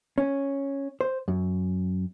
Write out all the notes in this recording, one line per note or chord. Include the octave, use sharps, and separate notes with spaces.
C#4
C5
F#2